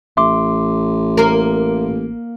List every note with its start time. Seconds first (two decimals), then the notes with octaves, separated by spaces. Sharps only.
0.17 A1 E5 C6 D6
1.17 A#3 A#4